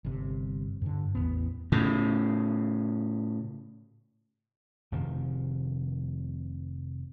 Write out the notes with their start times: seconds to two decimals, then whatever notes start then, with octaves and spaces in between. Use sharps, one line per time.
0.05 G1 C3
0.82 G2 D3
1.15 A1 E2 A#2 B3
1.72 A2 C#3
4.92 F1 C3 D#3 F3